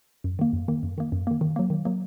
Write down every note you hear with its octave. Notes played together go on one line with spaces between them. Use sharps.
F#2
D#3 A#3
F#2
D#3 A#3
F#2
D#3 A#3
F#2
D#3 A#3
D#3
F#3 A#3
D#3
F#3 A#3